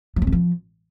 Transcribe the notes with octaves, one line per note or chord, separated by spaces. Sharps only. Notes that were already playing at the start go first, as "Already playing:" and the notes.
F3
C4
E3
F3